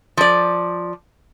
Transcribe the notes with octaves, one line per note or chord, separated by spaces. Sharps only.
F3 D5